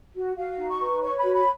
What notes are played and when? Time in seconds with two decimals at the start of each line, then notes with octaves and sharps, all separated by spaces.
0.14 F#4
0.36 F#4 F5
0.58 D#4
0.69 C#6
0.79 B4
1.01 C#5 C#6
1.18 F#4 B5
1.34 B5